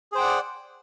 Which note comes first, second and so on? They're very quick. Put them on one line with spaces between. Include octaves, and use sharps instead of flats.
G#4 C5 G5 F#5 D5